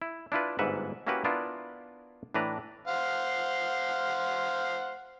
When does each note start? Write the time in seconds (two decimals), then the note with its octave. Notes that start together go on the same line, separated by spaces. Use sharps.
0.02 E4
0.32 D4 E4 F4 B4
0.59 G1 G#2 A#3 B4 E5 F#5
1.07 A#3 C#4 E4 F#4 G4 B4
1.24 B3 D4 E4 F4 A#4
2.34 A2 E3 D4 B4 A#5
2.88 C5 F5 F#5